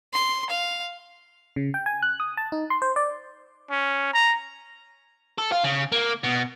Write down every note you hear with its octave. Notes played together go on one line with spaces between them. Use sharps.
C6
F5
C#3
G5
G#5
F#6
D#6
A5
D#4
C6
C5
D5
C#4
A#5
A4
F4
C#3
A#3
B2